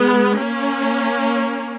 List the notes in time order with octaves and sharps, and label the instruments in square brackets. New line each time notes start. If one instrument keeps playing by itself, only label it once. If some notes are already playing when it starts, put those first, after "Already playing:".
Already playing: [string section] G#3 B3
A#3 C#4